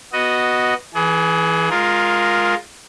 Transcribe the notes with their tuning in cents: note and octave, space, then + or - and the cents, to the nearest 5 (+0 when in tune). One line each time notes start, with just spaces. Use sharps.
B3 +0 F#4 +0 D#5 +0
E3 +0 G#4 +30
G#3 +0 F4 +15 A#4 +0